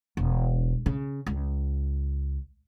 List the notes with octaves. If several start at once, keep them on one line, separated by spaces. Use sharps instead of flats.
E1
C#3
C#2